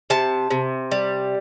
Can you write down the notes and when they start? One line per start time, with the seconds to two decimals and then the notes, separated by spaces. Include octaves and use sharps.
0.10 C3 A5
0.51 C3
0.91 G3